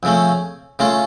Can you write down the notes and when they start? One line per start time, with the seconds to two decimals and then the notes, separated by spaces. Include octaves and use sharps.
0.03 F2 C#3 A3 C#4
0.79 C#3 A3 C#4 F4